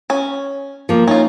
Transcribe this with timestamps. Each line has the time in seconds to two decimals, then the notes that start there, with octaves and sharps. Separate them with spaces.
0.10 C#4
0.89 F3 A#3
1.08 C#4 D#4 F4